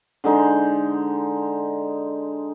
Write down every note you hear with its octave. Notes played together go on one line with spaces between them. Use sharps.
D3 G#3 D#4 C5